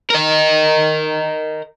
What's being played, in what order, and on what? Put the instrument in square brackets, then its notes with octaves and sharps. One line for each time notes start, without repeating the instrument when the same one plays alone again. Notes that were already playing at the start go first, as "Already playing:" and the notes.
[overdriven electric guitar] A#4 D#5